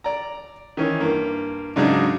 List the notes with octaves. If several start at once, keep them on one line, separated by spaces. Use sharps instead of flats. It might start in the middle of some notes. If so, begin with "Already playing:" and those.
D5 A#5
D#3 E3 C#4
G2 A#3
G#2 C#3 F#3 G#3 D4 D#4